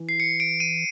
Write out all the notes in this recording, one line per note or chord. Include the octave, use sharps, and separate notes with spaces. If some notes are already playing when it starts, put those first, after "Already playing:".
Already playing: E3
C7
C#7
D7
D#7